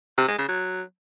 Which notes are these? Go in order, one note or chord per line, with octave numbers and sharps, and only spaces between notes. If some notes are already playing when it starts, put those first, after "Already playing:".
C3
G#3
C#3
F#3